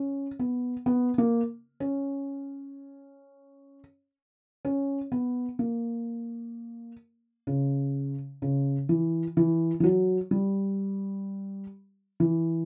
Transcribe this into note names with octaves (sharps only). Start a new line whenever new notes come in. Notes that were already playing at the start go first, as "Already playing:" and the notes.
Already playing: C#4
B3
B3
A#3
C#4
C#4
B3
A#3
C#3
C#3
E3
E3
E3
F#3
G3
E3